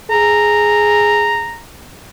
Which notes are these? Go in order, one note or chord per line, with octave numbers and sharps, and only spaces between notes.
G#4 A#5